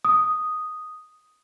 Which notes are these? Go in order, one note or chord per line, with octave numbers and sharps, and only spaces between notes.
D#6